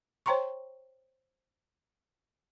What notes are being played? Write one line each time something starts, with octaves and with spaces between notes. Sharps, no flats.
C5 C#5 G5 A#5 C6 C#6